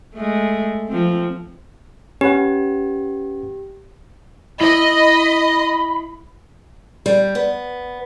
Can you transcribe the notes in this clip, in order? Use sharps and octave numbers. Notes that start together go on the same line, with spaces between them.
G#3 A3
F3 C4
C#4 G4 B4 F#5
E4 D#5 B5
G3
B3